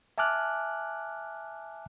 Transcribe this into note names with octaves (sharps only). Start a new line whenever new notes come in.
E5 G#5 A5 D6 F6 F#6